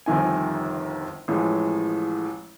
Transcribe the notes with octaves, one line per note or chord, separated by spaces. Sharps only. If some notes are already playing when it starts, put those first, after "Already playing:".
G1 F2 C3 D#3 G#5
A1 A2 F3 G#3